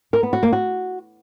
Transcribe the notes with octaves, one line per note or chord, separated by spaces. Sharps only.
A#4
B3
F#4
A#3
F#4